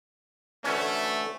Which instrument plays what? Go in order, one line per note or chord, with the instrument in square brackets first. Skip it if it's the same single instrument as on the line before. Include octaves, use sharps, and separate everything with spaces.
[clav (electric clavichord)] D2 E3 C#4 [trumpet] A3